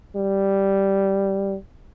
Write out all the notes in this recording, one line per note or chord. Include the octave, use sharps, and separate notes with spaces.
G3